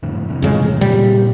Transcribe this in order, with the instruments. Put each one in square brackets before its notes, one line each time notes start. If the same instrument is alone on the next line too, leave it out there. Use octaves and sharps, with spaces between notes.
[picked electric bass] F2 A2 D3
A2 C3 E3
[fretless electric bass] F2 C#3 G#3
[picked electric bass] A#2 C#3 [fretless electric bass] G3